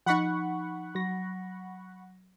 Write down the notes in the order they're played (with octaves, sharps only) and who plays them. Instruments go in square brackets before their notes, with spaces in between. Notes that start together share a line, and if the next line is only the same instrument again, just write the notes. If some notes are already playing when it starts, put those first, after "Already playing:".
[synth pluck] F3 D#4 [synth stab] F#5 B5 C#6
[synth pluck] F#3 A#6